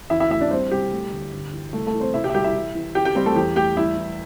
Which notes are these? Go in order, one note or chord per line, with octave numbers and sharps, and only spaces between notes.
E2 E4 E5
E4 E5
A3 E4 E5
D4 D5
G3 C4 C5
C2 G4
A3
D2
G1
E3
C2 A3 A4
A3 A4
E3
C4 C5
C3 E4 E5
G4 G5
E5
C2 G4 G5
E4 E5
E3
E3
E3 G4 G5
G4 G5
G3 C4 C5
A3 A4
E2 G4
A3 G4 G5
G3 E4 E5
E3